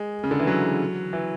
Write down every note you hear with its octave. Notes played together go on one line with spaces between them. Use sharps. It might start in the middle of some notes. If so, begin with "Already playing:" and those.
Already playing: G#3
C#3
D3
E3
F#3
E3